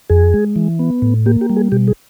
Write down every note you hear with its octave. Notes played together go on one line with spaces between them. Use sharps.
F2 G#4
G#3
E3
B3
A2
A#3 G4
G4
G3
G#4
B2 G4
G#4